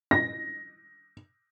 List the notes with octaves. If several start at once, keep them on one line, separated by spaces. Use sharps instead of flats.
A#6